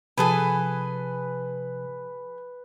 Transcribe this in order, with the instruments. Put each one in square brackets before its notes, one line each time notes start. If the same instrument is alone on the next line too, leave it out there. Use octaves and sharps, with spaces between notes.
[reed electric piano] C3 F3 [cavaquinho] G#4 A4 G#5 [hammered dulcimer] B4